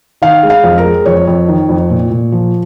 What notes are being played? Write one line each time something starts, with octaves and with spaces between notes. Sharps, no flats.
D#3 F5
G#3
F5
F2
A#4
G#3
F2 C#5
F2
D#3
F2
A#2
A#2
F3